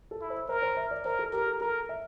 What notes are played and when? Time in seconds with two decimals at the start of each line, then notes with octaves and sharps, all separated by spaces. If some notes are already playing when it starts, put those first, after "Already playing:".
0.11 A4
0.21 E4
0.30 C5
0.49 A#4 C5
0.62 C5
0.77 E5
0.91 D5
1.05 A#4 C5
1.19 A4
1.33 G4 A#4
1.47 A4
1.61 A4 A#4
1.89 E5